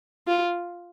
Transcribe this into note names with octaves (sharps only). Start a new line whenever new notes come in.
F4